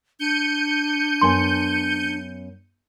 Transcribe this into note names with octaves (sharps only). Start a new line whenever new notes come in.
D4 G6 C#7 D#7
F#2 B3 G#5 C6